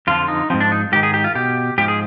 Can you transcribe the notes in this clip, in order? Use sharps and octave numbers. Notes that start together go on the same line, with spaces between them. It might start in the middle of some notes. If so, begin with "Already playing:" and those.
F2 D3 F3 F4
D#4
G#2 F3 C4
D4
D#4
G#2 D#3 G4
G#4
G4
F4
B2 G4
G#2 F3 G4
G#4